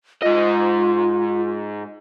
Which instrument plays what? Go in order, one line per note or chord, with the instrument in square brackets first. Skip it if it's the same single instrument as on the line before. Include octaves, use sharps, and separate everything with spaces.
[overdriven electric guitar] G#2 D#5 [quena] F4